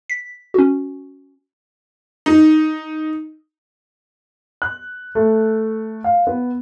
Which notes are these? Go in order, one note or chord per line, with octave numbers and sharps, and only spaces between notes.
B6
C#4 F#4
D#4
F#6
A3
F5
B3